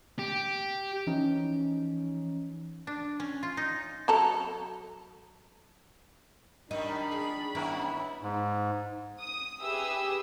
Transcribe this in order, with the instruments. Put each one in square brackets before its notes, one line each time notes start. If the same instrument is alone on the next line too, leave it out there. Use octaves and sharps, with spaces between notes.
[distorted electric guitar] G4
[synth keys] E3 F3 C#4 D#4
[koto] D4
C#4
F4
D#4
[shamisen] F#3 A4 A#5
[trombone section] D#3 [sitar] F#3 G3 [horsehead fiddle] D4 B5 [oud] D#4
[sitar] G#4
[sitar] D#3 C#4 [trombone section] B3 E4 [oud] A#4
[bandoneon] G#2
[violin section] D#6
G4 G#4 B4 E5 D#6 E6